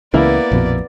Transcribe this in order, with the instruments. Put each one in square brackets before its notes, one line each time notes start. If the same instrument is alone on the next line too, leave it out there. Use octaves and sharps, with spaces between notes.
[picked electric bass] C#2 C#3 E3 [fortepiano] A#3 E4 A#4 [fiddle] B3 D5
[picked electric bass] A#1 F2 B2